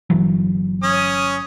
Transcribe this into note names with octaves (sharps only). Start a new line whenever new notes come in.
G1 E3 F#3
C#4 D#6